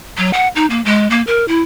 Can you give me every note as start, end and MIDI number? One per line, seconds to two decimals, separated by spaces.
0.18 0.31 54
0.33 0.48 78
0.56 0.66 63
0.70 0.81 58
0.85 1.08 56
1.10 1.22 58
1.27 1.45 70
1.48 1.62 64